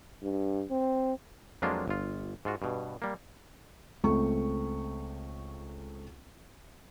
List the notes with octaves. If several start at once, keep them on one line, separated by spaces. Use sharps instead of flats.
G2
C4
F2 F#3 G#3 A#3 D4 F4
G1 F4
G#2 F4 F#4
G2 B2
G3 A#3
C#2 A3 C4 C#6